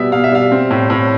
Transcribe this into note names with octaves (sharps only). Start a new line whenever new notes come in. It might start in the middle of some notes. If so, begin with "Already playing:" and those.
Already playing: B2 G3 E5
B2 F5
E5
G3 F5
C4
A2
A2